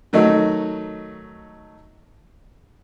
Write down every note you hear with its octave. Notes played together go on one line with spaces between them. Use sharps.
D#3 F#3 A3 D#4